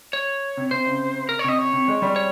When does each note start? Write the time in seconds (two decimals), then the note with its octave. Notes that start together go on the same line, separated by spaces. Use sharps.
0.13 C#5
0.57 C3
0.71 C3 C5
0.86 C#3
1.29 A#4
1.39 C#5
1.44 C3 D#5
1.58 C#5
1.73 C3
1.88 G#3
2.02 G3
2.16 C#5